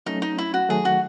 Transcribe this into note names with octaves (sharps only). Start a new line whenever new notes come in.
F#3 A3 C#4 D#4
D#4
E4
F#4
D#3 F#3 A3 G#4
F#4